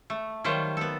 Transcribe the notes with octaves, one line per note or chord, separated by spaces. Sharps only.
A3
D#3 F#3 G3 F4 C5
B3 A4